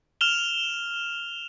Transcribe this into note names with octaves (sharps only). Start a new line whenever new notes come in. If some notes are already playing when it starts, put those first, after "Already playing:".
F6 E7 F7 G7